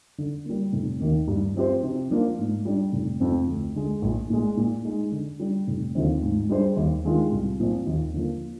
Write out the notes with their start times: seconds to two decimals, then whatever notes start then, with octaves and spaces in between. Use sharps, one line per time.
0.18 D3
0.46 G3 A#3
0.73 F1
1.00 D#2 D#3 A#3
1.28 G2
1.56 F3 C4 G4 C5
1.83 C3
2.10 F3 A#3 D4 F4
2.38 G#2
2.65 G3 D4
2.93 F1
3.20 F2 C3 F3 C4
3.47 D2
3.75 D3 G#3
4.02 A#1
4.30 A#2 G#3
4.57 A#2
4.85 G#3 D#4
5.12 D3
5.40 G3 D4
5.67 F1
5.95 D#2 D3 F3 C4
6.22 G#2
6.50 G3 D4 G#4 C5
6.77 D#2
7.05 D#3 G#3 D4 F4
7.32 C2
7.60 A#2 F3 C4
7.87 D#2
8.14 D3 F3 A#3